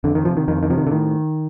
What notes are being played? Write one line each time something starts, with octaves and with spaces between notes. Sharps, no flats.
F2 D3
D#3
C3 F3
D#3
F2 D#3
D#3
C3 F3
D#3
D3
A2 D#3